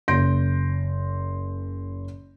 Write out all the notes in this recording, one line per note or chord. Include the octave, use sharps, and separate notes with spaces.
F#1 C6 G6 A#6 D7